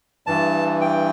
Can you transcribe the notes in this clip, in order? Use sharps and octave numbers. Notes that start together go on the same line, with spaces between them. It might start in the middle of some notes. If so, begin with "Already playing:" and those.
G2 E3 A5
G5